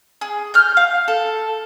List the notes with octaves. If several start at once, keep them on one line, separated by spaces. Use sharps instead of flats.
G#4
F6 G6
F5
A4